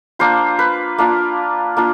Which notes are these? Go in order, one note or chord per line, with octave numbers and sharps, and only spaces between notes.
A#3 D4 F4 C5
B4
A#3 D4 F4
A#3 D4 F4